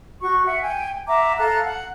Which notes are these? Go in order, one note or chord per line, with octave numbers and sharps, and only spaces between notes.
F#4 C#6
E5 F#5
G5 G#5
E5 F#5 A#5 D6
A4 F5 A#5 F#6
F#5